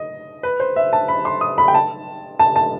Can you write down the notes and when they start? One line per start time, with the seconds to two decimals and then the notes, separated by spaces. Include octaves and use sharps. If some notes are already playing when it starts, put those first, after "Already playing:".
Already playing: D#5
0.43 B4
0.60 C5
0.76 E5
0.93 A5
1.08 B5
1.25 C6
1.41 D#6
1.58 B5
1.68 G5
1.74 A5
2.39 A5
2.56 A5